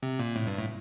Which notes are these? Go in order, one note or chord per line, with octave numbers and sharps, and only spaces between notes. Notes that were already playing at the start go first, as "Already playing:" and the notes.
C3
A#2
A2
G2
A2